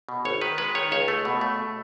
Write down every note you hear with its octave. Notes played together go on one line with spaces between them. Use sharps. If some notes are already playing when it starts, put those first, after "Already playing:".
B2
G#1 C#5
D#3 B4
G#3 B4
D#3 C#5
C#2 C#5
A3
B2
A3